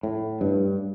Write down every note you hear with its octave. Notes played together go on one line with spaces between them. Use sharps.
A2
G2